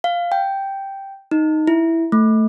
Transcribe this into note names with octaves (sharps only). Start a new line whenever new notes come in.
F5
G5
D#4
E4
A3